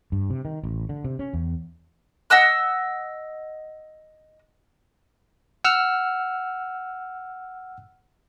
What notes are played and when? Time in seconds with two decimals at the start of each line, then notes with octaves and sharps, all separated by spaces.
0.12 G2
0.30 C3
0.45 D#3
0.63 A1
0.89 D3
1.04 C3
1.19 C#4
1.34 E2
2.30 D#5 F#5 E6 F#6
5.65 F#5 E6 F6